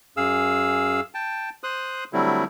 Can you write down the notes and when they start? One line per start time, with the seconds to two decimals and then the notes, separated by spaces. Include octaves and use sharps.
0.17 F#2 G#4 F5 E6
1.14 G5 A5
1.64 C5 C6 D#6 F#6
2.13 D3 F#3 G3 A3 C4 E4